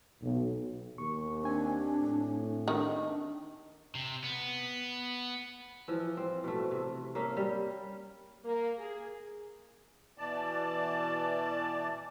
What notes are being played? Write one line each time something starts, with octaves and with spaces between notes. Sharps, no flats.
B1
D#2 C#6
C4 D4 G#5
A2
D#3 D4
C3
B3
E3 F3
C4
B2 A3
C3
A#3 C#4 E5 F5
G3
A#3
G#4
B2 E3 D5 A5